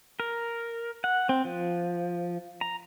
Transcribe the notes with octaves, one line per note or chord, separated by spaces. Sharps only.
A#4
F#5
C4
F3
A#5